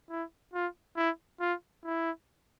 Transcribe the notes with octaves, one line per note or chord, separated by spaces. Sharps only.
E4
F4
E4
F4
E4